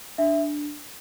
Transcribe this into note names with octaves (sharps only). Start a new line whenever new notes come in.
D4 E5